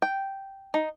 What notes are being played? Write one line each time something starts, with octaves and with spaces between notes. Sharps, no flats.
G5
D#4